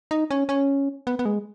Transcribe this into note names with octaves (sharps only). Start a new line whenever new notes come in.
D#4
C#4
C#4
B3
B3
G#3